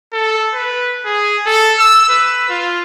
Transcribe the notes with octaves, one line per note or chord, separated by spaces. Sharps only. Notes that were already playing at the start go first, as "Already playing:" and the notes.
A4
B4
G#4
A4
E6
B4
F4